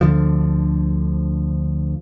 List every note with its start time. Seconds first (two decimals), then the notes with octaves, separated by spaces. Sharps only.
0.01 D2 D3 F3